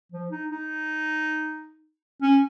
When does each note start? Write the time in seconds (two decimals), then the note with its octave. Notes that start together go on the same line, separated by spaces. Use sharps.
0.12 F3
0.31 D#4
0.50 D#4
2.22 C#4